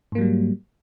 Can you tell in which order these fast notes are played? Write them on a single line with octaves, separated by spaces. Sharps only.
G#2 A#3 F#3 G3